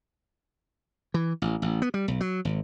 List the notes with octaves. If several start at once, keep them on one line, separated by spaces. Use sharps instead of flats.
E3
A1
A1
B3
G3
B1
F#3
G#1